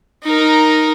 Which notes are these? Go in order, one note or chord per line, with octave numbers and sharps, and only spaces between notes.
D#4 A#4